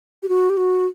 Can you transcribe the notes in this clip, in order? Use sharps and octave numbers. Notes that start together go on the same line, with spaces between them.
G4
F#4
G4
F#4